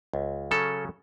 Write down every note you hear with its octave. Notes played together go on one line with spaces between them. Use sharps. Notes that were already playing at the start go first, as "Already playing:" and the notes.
C#2
C#3 F#3 C#4 A4